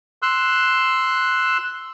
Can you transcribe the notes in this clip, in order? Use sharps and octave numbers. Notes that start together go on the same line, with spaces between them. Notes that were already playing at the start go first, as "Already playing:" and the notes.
C6 E6 F#6